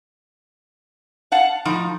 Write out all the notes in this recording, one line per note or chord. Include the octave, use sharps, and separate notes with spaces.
F5 F#5 A5
A2 F3 D#4